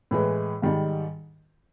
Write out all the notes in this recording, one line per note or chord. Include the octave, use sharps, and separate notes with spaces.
A2 E3 G#3
G#2 D#3 G3